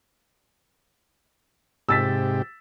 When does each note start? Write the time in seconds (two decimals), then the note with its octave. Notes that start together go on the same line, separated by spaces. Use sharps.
1.89 G#2 C3 G4 E6 A6 B6